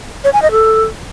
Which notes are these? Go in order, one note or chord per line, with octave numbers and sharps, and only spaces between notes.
C#5
G#5
D#5
A4